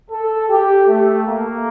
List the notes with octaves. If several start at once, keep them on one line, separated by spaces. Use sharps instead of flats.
A4
G4
A3
A#3